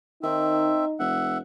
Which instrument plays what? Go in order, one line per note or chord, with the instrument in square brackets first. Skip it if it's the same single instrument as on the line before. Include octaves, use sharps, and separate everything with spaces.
[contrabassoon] D#3 [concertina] C4 E5 [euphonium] D#4
[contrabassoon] F1 [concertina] E5 F#5